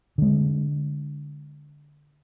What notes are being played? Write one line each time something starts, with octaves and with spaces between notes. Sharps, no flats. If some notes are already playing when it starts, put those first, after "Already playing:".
D3 G#3